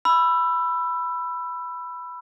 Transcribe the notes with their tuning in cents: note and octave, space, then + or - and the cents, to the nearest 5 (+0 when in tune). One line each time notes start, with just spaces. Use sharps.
B5 +0 E6 +20